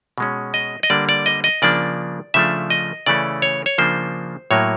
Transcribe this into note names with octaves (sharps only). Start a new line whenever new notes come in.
B2 G#3 C#4
D#5
D#5
D3 G3 A#3 D4 D5
D5
D#5
D#5
C#3 F3 A#3 D4 D5
C#3 F3 A3 D4 E5
D#5
C#3 E3 A3 C#4 D5
C#5
C#5
C#3 F3 A#3 D4 C5
A2 F#3 A#3 C#5